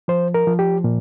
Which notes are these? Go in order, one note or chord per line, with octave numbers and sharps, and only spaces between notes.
F3 C5
A#4
F3
G4
A#2